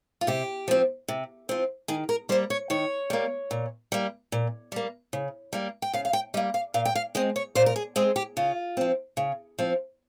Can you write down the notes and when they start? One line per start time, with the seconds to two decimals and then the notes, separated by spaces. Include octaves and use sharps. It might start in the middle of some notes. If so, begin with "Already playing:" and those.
0.21 F4
0.27 C3 G4
0.68 F3 C4
1.08 C3
1.49 F3 C4
1.88 D#3 G#4
2.09 A#4
2.29 G3 A#3 C5
2.50 C#5
2.70 D#3 C#5
3.10 G3 A#3
3.51 A#2
3.92 G3 A#3
4.32 A#2
4.72 G3 A#3
5.13 C#3
5.53 G3 A#3
5.82 G5
5.93 C#3 F5
6.05 F5
6.13 G5
6.34 G3 D#5
6.37 A#3
6.54 F5
6.74 A#2 F5
6.85 G5
6.95 F5
7.15 G#3 C4 D#5
7.36 C#5
7.55 A#2 C5
7.66 A#4
7.76 G#4
7.96 G#3 C4 G#4
8.16 G4
8.37 C#3 F4
8.77 F3 C4
9.17 C#3
9.59 F3 C4